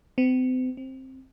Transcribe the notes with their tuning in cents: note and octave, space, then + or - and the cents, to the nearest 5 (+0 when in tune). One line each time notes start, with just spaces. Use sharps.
C4 -40
C4 +10